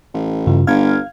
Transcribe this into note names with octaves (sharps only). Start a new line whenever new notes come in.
A1
G2 C#3 F4
G1 F5 F6 G#6